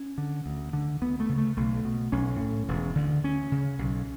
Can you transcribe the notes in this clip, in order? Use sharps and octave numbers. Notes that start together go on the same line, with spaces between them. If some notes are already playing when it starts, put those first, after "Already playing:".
Already playing: C#4
D3
D2
D3
D2 B3
A3
C#3
A3
B1 A3
B2
B1 C#4
A2
E1
D2 D3
D2 C#4
C#3
B1